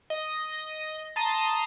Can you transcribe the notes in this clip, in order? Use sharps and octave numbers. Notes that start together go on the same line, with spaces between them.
D#5
A5 A#5 C6 D#6